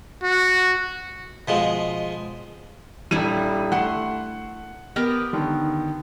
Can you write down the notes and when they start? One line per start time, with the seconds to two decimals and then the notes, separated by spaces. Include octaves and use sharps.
0.23 F#4
1.48 B2 F3 G#3
3.11 D#1 G3 D4 E4 D#7
3.72 A3 F#5 C6
4.96 B3 G4 A#4
5.33 D3 D#3